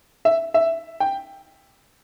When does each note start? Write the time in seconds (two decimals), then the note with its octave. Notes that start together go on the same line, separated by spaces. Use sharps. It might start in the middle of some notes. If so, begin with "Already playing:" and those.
0.25 E5
0.54 E5
1.00 G5